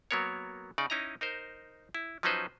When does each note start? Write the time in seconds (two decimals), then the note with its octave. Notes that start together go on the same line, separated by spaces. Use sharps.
0.11 F#3 A#3 B3 A#4 C#5
0.78 C#3 D#4 D5
0.90 C#4 D#4 E4 D#5 A#5
1.21 D#4 A#4 C5
1.95 E4
2.23 F3 F#3 C#4 D#4 B4 C5